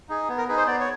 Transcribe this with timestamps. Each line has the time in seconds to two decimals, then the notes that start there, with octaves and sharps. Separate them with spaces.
0.09 D#4 G#4
0.29 B3
0.38 A#4
0.48 D#4 G#4 B4
0.57 C5
0.67 B3 D5
0.80 C#5